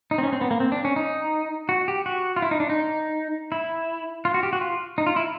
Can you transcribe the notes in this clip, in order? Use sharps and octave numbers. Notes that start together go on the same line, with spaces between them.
D#4
C4
C#4
C4
B3
A#3
C4
D4
C#4
D#4
F#4
G4
F#4
F4
E4
D#4
D4
D#4
E4
F4
F#4
G4
F#4
F4
D#4
F4
E4